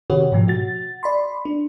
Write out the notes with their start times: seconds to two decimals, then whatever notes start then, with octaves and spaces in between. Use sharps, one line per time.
0.10 C3 D#3 F#4 G4 C#5
0.32 G#2 B2 F3 A3
0.48 F#4 A6
1.03 D5 B5 C6
1.45 D4